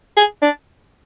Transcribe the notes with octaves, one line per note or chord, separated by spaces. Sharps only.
G#4
D4